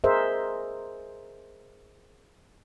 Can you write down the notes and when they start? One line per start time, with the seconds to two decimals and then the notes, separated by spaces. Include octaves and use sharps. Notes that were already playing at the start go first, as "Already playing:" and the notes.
0.04 G#4 A#4 C5 D#5 E5